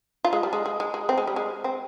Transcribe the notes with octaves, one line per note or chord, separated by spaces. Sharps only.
F4
G#3
G3
G#3
G#3
G#3
G#3
C4
G#3
G3
G#3
C4